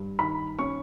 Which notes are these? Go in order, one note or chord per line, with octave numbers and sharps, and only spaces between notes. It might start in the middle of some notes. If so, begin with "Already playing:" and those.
Already playing: G2
D#3 B5
C#4 C#6